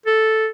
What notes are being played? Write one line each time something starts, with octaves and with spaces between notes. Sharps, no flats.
A4